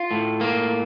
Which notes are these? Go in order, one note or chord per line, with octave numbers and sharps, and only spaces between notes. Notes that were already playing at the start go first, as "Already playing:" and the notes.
Already playing: F4
A2
A#3